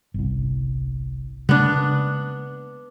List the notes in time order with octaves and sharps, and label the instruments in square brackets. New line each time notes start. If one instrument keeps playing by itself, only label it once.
[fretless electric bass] G1 C2
[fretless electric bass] C#3 G#3 A#3 [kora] B3 D4